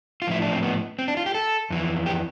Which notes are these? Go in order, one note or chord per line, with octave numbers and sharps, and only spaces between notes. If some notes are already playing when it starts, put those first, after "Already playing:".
F4
A2 F3 E4
D4
C4
B3
C4
D4
F4
G4
A4
F2 E3
G4